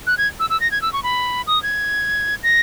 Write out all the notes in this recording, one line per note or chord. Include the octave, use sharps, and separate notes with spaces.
F#6
G#6
E6
E6
A#6
G#6
E6
C#6
B5
D#6
G#6
A#6